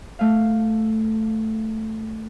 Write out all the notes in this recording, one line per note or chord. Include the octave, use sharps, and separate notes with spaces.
A3 F5